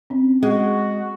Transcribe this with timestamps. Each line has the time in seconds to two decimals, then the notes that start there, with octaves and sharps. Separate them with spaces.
0.10 C4 C#4
0.43 G#3 F#4